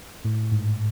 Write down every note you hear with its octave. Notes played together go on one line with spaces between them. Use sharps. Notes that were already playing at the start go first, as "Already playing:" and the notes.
A2
G#2